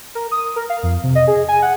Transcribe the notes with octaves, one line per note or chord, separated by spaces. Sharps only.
A#4
D#6
A#4
F5
F2
C3
D#5
G#4
G#5
F#5